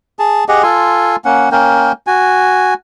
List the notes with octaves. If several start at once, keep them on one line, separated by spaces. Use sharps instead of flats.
G#4 A5
G4 G#4 D#5 F#5
F4 A4 G#5 C6
A#3 C#4 F#5
A#3 C#4 A#4 G5
F#4 G#5